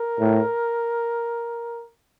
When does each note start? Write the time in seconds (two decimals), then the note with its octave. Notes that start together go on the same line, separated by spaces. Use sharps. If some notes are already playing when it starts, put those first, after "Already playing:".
Already playing: A#4
0.20 A2